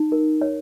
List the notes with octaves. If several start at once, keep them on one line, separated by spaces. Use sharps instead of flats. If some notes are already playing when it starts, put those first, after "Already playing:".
Already playing: D#4
A#4
C#5